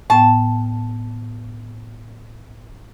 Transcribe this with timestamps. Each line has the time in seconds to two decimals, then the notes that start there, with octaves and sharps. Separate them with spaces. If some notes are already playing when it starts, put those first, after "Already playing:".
0.10 A2 B3 G5 A5